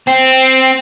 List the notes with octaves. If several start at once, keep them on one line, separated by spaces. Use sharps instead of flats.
C4